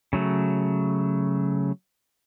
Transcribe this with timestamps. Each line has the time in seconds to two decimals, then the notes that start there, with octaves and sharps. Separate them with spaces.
0.13 C#3 F#3 A3